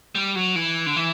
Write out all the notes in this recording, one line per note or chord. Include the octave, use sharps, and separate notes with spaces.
G3
F#3
E3
D3
E3